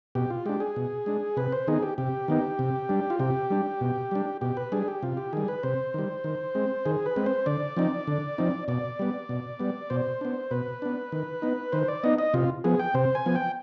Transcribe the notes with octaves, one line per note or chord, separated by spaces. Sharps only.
B2 G4
F4
G#3 D4 G4
G#4
B2
G#3 D4
C3 B4
C5
D#3 B3 D#4 G#4
G4
C3 G4
D#3 B3 D#4
C3
G3 D4
F4
C3 G4
G3 D4
B2
G3 D4
B2 G4
B4
G3 D4 G#4
G4
C3 F4
G4
D#3 G3 G#4
B4
C3 C5
D#3 G3
D#3
G#3 C4
D#3 G#4
B4
G#3 C4
C5
D3 D5
F3 C4 D#4
D3
F3 C4 D#4
B2 D5
G3 B3
B2
G3 B3
B2 C5
B3 D4
B2 B4
B3 D4
D#3
B3 D#4
D#3 C5
D5
B3 D#4 D#5
D#5
C3 F4
F3 B3 G#4
G5
C3 C5
G#5
F3 B3
G5